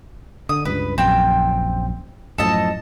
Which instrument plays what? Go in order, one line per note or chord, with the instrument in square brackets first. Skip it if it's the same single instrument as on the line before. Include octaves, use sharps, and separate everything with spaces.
[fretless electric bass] D3 [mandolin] D#6
[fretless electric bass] C#2 G2 [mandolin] B4
[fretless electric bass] A#1 F#2 [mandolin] C4 G5
[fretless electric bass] F#2 A2 F3 [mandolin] A4 D#5 A5